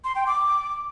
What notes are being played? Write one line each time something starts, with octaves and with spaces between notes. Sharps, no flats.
C6
G5
D6